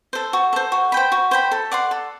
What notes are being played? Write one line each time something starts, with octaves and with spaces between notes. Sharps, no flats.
A4 C5
F#4
A4 C5
F#4
C5 G5 B5
F#4
C5 G5 B5
A4
D5 F#5 C6
A4